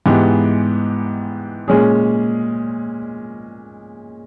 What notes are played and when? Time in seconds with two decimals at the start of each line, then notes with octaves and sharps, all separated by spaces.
0.06 G#2 E3 G#3 B3 G4
1.68 A#2 G#3 C#4 G#4